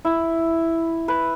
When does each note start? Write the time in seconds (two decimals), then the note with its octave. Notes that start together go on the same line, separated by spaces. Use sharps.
0.05 E4
1.08 B4